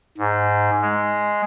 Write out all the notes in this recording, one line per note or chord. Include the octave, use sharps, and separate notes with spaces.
G#2
G#3